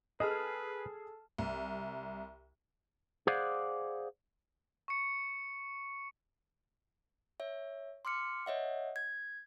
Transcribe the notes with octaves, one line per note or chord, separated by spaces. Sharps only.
G#4 A4 B4 D#5 A5 F6
C2
G#4 C5 D5 F5 F#5
C#6 C#7
C#5 E5
C6 D6 F6 C#7
C#5 D#5 E5 F#5
G#6